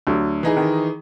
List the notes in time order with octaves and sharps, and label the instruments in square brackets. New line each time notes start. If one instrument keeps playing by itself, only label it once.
[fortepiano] D2 F#3
[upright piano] E3 D#4 G#4
[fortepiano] D#3